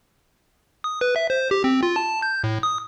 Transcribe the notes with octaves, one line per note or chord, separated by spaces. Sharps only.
D#6
B4
E5
C5
G4
C4
F4
A5
G6
A2
D#6